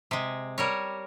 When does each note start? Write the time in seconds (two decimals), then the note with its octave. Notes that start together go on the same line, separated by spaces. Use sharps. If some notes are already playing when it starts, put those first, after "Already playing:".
0.11 C3 G#3
0.58 G3 A#4 C#5